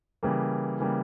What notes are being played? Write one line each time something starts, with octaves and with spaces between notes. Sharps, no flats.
C#3 E3 G3 A#3
C#3 E3 G3 A#3